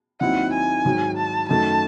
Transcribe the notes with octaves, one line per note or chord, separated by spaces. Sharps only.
D#2 D#3 F#3 C4 E4 F#5
G#5
G#2 D#3 F#3
A5
F#2 D#3 A3 A5